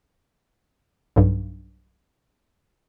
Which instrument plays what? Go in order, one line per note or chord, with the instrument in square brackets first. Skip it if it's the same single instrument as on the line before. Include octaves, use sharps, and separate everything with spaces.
[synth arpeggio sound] B1 G2